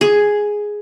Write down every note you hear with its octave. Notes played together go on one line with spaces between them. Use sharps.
G#4